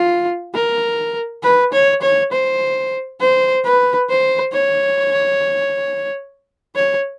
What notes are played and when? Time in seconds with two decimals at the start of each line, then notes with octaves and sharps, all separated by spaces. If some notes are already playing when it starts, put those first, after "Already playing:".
Already playing: F4
0.54 A#4
1.43 B4
1.73 C#5
2.02 C#5
2.32 C5
3.21 C5
3.65 B4
4.09 C5
4.53 C#5
6.76 C#5